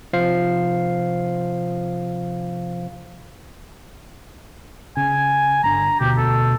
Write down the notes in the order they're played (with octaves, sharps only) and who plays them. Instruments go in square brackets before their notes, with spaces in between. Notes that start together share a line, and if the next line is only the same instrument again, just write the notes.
[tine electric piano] C3 F3 C5 F5 C7
[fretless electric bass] C#3 [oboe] G#5
[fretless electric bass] G1 D3 [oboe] A#5
[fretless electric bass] E1 D2 [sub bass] B2 [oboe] G4
[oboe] A4